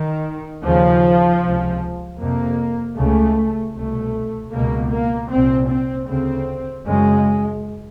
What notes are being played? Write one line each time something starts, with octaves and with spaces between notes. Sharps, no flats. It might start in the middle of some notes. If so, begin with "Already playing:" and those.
Already playing: D#3
D#2 C#3 F3
C#2 C3
F2 C3 A#3
C#2 C#3 A3
C2 B2 A3
C#2 B2 A#3
A#3
C2 A#2 C4
C4
D2 C#3 C4
F#2 C#3 G#3